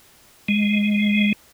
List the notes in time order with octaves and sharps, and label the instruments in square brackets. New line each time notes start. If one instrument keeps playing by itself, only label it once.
[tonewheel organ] G#3